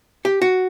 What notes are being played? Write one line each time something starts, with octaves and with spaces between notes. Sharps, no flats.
G4
F#4